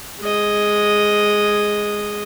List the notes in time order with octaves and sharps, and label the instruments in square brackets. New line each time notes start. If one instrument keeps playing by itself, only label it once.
[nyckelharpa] G#3 D#5